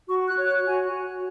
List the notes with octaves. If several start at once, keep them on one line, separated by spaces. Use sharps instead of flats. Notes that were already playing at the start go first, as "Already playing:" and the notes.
F#4 C#6
F#6
C#5
F#6
F#4 G#5